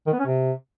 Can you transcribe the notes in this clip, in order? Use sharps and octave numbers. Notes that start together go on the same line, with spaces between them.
D#3
B3
C#4
C3